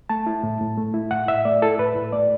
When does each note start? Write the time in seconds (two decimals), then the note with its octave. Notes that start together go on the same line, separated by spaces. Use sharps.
0.09 A3 A5
0.26 E4
0.43 A2
0.61 A2
0.78 A3
0.94 E4
1.11 A2 F#5
1.28 A2 E5
1.45 A3 D5
1.62 E4 A4
1.79 A2 B4
1.96 A2
2.13 A3 D5